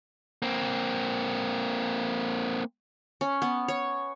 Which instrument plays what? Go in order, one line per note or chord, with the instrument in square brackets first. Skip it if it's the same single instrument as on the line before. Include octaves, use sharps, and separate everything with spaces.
[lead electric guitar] A#3 C4
[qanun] C#4
B3
C#5